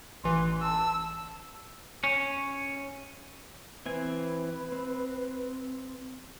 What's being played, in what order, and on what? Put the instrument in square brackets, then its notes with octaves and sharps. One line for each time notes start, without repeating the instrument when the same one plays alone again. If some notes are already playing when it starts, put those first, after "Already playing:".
[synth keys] A1 E3 [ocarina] C6
[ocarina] A5 [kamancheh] E6
[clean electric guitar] C#4
[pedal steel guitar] E3 C4 G#5 [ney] B4
[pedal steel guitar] C4